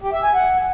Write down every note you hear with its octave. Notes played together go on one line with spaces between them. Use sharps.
G4
E5
G#5
F#5